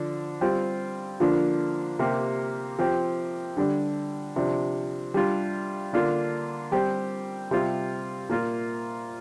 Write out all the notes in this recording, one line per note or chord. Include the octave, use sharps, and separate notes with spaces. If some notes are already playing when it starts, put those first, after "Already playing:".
Already playing: D3 F3 D4
G3 C4 F4
D3 F3 A#3 D4 F4
C3 A#3 G4
F3 C4 G4
D3 G3 D4
C3 F3 D4
G3 D4 F4
D3 A#3 D4 F4
G3 C4 G4
C3 G3 C4 F4
A#2 A#3 F4